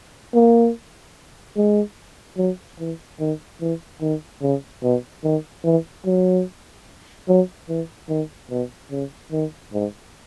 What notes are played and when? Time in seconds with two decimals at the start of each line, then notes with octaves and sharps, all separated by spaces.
0.34 A#3
1.56 G#3
2.37 F#3
2.79 E3
3.20 D#3
3.61 E3
4.02 D#3
4.42 C#3
4.83 B2
5.24 D#3
5.64 E3
6.05 F#3
7.28 F#3
7.69 E3
8.09 D#3
8.50 B2
8.91 C#3
9.32 D#3
9.73 G#2